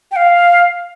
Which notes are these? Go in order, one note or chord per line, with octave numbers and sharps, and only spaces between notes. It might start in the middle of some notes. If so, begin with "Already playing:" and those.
G5
F5